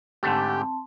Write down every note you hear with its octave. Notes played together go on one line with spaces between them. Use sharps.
G#2 D3 A3 C4 G4 A5 C6